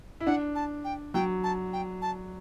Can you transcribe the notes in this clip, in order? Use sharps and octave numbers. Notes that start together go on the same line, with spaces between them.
E4
D4 F#5
A5
G5
F#3 G5
A5
G5
A5